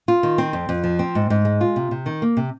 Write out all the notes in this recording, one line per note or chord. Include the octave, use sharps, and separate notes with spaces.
F4
D#3
C4
F2
F2
F3
C4
G#2
G#2
G#3
F4
C3
C3
D#3
A#3
C3